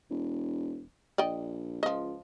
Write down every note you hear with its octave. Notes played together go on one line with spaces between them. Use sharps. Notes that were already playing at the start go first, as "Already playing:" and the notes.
E1
A#1 D5 D#5 G5
C#2 F3 D#5